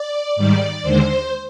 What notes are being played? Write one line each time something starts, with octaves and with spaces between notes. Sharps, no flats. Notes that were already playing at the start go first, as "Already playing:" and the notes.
Already playing: D5
G#2 D#3 G3 D5
D#2 D3 G#3 C5